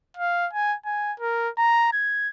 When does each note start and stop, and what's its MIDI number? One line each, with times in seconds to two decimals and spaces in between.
0.17 0.48 77
0.53 0.75 80
0.86 1.13 80
1.20 1.49 70
1.58 1.89 82
1.93 2.29 92